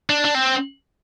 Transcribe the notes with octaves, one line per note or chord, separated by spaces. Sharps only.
D4
D4
C4